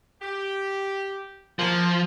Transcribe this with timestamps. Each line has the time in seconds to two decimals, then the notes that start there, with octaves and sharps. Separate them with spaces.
0.22 G4
1.59 F3 A#3